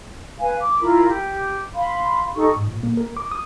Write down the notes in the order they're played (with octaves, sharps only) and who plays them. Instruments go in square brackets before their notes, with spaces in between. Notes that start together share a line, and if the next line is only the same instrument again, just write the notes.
[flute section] B4 F5 G#5
D6
E4 F4 A#4 B5
G4
F5 B5 C6
D#4 G4 A4 C#6
[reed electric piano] G#2
A#2
A#3
A#4
D6
D#6